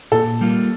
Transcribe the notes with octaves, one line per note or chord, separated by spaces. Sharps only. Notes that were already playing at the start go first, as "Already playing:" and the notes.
A#2 A4
G3 A#3 F4